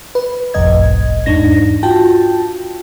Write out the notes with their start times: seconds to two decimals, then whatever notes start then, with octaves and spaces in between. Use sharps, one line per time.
0.15 B4
0.54 G1 C2 F2 A2 D#5 G#6
1.26 E2 G#2 D4 D#4 A#6
1.83 F4 F#4 G5 A5